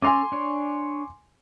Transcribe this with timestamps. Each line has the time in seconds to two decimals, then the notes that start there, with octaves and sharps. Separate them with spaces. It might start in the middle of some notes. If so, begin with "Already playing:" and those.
0.02 C#4 A4 G#5 A#5 C6 D6
0.32 D4 C#5